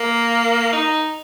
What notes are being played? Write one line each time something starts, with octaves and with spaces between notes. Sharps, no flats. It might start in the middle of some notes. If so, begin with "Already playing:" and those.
Already playing: A#3
D#4